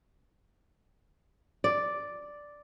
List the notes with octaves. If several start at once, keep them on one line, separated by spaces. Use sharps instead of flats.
D5